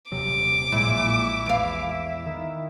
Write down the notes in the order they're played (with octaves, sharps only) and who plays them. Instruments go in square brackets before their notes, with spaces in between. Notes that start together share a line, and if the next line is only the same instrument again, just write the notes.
[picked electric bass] D#1 C3 F#3 [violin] D6
[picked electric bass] A#1 G#3 [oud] A#2 [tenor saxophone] E4
[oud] E2 F5
[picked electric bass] D#3